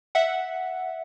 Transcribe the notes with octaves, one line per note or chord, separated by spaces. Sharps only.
E5 F#5